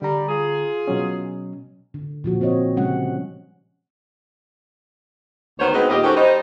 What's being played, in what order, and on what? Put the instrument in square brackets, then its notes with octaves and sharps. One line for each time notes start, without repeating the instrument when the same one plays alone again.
[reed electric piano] D3 A#5 [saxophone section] G3
[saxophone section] F4 G#4
[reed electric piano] B2 F#3 C#4
[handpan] D3
A#2 F3 F#4
C4 F#4 C#5 D#5
C#3 G3 G#3 C#4 F#5
[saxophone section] D2 D#3 B3 C5 C#5
G#3 B3 C4 D#4 F#4 B4
D#2 A#2 G4 G#4 D#5
D#3 C#4 F#4 G4 A4 C5
G3 D#4 C5